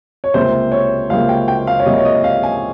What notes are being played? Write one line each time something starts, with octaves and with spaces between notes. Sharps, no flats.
C#5
C#2 C3 G3 A#3 C5
C#5
C#2 C3 G3 A#3 F5
G5
G5
F5
C#5
C#2 C3 G3 A#3 D#5
C#5
D#5
F5
G#5